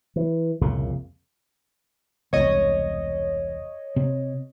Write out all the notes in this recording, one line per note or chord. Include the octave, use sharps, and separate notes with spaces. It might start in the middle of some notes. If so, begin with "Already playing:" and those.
E3
C2 F2 A#2 C#3
E1 C2 C#5 D#5
C3 C4